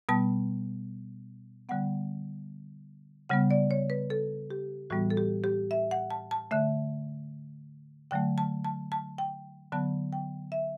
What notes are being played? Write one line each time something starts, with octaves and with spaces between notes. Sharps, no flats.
B2 G3 B3 A5
D3 G3 B3 F#5
C#3 G3 B3 F#5
D5
C#5
B4
A4
G4
A2 E3 G3 B3 F#4
A4
G4
G4
E5
F#5
A5
A5
D3 A3 E5
D3 F#3 A3 G5
A5
A5
A5
G5
D3 F#3 B3 A5
G5
E5